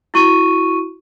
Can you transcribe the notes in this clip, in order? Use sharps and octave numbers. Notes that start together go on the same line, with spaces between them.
E4 F#4 C#6 D#7